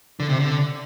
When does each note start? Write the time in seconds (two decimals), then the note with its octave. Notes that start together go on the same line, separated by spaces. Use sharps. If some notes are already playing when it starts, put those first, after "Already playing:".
0.20 D3
0.29 C3
0.40 D3